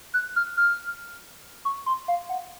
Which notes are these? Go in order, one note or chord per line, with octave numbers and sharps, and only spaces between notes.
F#6
F6
F6
C#6
C6
F5
F#5